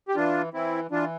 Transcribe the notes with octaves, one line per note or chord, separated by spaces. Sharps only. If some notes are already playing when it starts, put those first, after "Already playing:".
G4
E3 D4 F4
E3 C4 E4
E3 D4 F4